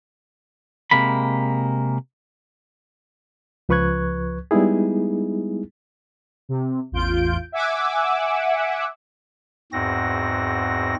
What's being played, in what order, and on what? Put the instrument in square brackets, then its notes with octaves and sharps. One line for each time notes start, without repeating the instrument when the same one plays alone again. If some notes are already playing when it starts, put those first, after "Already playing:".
[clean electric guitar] C3 G#3 A#3 B5
[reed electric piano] C#2 F3 B4 C#6 F#6 G#6
G3 G#3 B3 D#4 E4 G#4
[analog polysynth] C3
A1 E2 F4 G6 D7
E5 F#5 G#5 D6 E6
[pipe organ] E2 G#2 C4 F#4 A#6